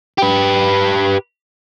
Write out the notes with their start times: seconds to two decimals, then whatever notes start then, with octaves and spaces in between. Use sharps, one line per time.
0.18 G4 B4